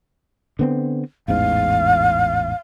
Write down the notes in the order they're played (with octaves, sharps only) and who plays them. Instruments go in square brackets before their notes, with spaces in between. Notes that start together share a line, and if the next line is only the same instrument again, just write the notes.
[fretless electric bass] D3 B3 C4
[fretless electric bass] A1 E2 G#2 [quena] F5